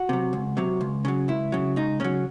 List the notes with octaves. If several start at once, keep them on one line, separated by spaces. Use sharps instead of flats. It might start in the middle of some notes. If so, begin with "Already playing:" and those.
Already playing: F#4
C3 F#3
C#2
C3 F#3
C#2
C#3 F#3
C#2 E4
C#3 F#3
C#2 D#4
C#3 F#3 C#4